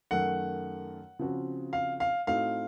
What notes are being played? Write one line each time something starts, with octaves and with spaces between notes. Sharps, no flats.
F#2 D#3 A3 F#5
C#3 F3 C4 F#4
F5
F5
A2 A3 C4 D#4 F#4 F5